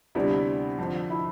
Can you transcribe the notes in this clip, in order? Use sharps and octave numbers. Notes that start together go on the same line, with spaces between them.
D2 C3 G3 B3 D4 E4
F2 D3 F3
E4